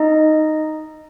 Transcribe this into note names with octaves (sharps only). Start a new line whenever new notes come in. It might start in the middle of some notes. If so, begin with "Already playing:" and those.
Already playing: D#4 D#5